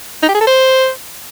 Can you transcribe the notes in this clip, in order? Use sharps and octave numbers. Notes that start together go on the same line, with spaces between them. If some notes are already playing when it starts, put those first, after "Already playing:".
D#4
G4
G#4
A4
C5